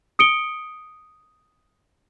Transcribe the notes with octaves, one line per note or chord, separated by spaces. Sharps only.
D#6 C#7 D7 G7